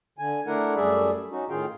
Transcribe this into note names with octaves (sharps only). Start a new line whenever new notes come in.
D3 G#5
A3 D4 E4 A#4 F#5
F#2 G3 A3 G#4 D5 E5
C#4 D#4 F#4
A2 D#3 F4 G#4 F5 G5